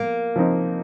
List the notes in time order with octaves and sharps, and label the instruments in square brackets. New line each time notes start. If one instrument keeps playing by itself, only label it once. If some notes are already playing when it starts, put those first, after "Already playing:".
Already playing: [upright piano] F3 [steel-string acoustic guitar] A#3
[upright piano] F3 C4 D#4